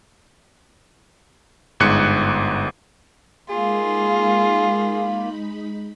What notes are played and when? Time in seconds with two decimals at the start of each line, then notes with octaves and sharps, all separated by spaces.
1.80 G1 G#2 F#6 C#7
3.50 G#3 A#3 D#4 F4 G#4 B5